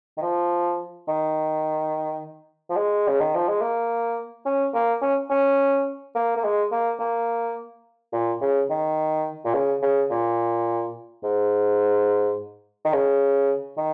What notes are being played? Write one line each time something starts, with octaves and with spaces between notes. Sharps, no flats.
D#3
F3
D#3
F3
G#3
C#3
D#3
F3
G#3
A#3
C#4
A#3
C#4
C#4
A#3
A#3
G#3
A#3
A#3
A#2
C#3
D#3
A#2
C#3
C#3
A#2
G#2
D#3
C#3
D#3